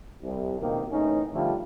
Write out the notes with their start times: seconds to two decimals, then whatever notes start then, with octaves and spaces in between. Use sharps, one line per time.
0.22 C2
0.60 C#2 B2 D#3 A#3 C4
0.91 E2 A2 C#4 D#4
1.34 D3 F3 G3 A3 F4